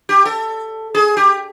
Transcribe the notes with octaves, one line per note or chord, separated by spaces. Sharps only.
G4
A4
G#4
G4